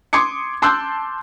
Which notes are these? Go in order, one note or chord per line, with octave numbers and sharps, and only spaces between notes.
C6 D6 D#6 G#6 C#7
A5 C6 D6 E6 F#6 G6